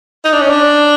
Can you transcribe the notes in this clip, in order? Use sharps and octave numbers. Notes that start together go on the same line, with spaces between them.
D#4
D4
C#4
D4